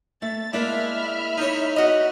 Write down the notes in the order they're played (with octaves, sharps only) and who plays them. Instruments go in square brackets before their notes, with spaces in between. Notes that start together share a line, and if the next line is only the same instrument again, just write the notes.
[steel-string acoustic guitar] A3 E5 [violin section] A6
[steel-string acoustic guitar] G#3 A#3 E4 [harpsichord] D4 [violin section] E5 B5 F6
[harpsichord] D#4 C#5
[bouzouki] F#4 D#5